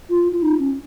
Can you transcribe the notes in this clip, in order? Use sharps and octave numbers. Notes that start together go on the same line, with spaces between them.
F4
F4
D#4
C#4